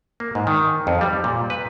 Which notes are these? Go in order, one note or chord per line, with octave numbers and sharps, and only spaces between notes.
A#3
G#2
D#3
F2
G3
A#2
B4